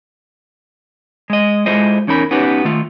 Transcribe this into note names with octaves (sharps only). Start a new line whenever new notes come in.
G#3 D#5
G#3 E4 F4 A4 C5 D#5
E2 C#4 D#4 A#4 B5
B3 C#4 D#4 F#4 G4 B4
D#3 A3 F4